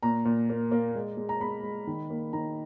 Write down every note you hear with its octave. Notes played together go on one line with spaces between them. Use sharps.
A#2 A#5
A#2
A#3
A#3
G#3
G#3
A#5
G#3 B5
G#3
D#3
A#3
D#3 A#5